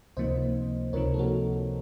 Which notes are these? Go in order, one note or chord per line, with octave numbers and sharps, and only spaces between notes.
C#2 C3 F3 A#3 D#4 C5 D#5
C#2 C3 F3 A#3 D#4 A#4 C#5
A4
F#4 A#4